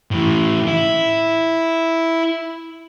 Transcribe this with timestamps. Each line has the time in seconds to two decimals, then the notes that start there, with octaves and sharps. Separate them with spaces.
0.11 A2 E3
0.67 E4